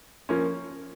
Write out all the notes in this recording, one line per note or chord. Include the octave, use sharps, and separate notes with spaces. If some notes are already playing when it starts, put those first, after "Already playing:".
F3 A#3 C#4